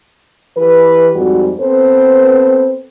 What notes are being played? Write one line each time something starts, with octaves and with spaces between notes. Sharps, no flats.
E3 G4 B4
F2 G#2 G3 F#4
B3 C4 A4 B4 C5